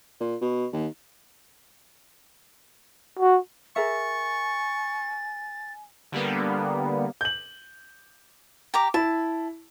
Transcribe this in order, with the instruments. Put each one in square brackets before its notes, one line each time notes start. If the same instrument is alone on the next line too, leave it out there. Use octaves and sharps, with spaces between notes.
[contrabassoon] A#2
B2
D#2
[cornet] F#4
[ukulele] G#4 A#4 E5 [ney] G#5 [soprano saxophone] C#6 [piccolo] A6
[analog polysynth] D3 G3 A#3 B3
[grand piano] G6 F#7
[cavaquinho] G4 A#5 D6
[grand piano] E4 [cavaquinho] A5